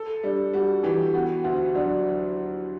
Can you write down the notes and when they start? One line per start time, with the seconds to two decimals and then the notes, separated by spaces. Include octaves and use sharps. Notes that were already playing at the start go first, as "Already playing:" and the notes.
Already playing: A4
0.23 G3 D4
0.53 G3 F#4
0.83 E3 G4
1.14 B3 F#4
1.44 D2 F#4
1.75 F#3 D4